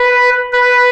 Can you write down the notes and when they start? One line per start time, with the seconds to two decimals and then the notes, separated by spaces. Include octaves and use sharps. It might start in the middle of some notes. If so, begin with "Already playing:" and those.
Already playing: B4
0.53 B4